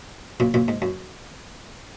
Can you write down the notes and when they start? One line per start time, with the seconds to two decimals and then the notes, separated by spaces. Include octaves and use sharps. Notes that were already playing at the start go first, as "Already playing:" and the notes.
0.40 F#2 A#2
0.54 F#2 A#2
0.68 G#2
0.82 F#2